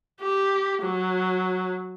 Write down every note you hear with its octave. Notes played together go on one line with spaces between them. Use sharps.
G4
F#3